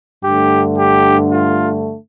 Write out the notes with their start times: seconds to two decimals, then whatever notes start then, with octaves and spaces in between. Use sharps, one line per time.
0.22 G2 D3 A3 G4
0.77 G4
1.30 F4